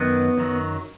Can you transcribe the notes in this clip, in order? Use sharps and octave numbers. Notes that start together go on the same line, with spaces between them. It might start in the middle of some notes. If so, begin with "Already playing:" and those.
Already playing: F#2 D#3 F#3 B3
F#2 D#3 F#3